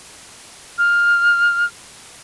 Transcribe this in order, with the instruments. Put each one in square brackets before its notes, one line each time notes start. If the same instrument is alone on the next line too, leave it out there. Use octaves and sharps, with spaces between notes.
[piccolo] F6